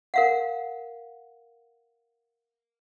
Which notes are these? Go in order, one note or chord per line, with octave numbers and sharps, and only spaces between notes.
A#4 F5 F#5